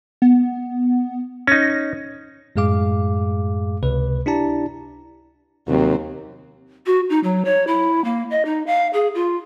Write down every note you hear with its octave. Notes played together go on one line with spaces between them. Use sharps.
B3
C#4 D#4 A#6
F#2 A2 G#3 G#4 F5 D6
C#2 C3 B4
D4 E4 G4 D5 A5 A#5
D#2 C3 F#3 C4
F#4
D#4
F#3
C#5
E4
A#3
D#5
D#4
F5
G#4
F4